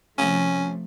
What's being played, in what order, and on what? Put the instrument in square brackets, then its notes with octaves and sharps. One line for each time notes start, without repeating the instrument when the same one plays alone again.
[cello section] C3 F3 A3 [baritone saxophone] C#4